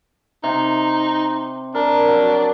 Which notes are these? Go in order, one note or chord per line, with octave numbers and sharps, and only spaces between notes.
C3 D#4
D4 A#4
F#3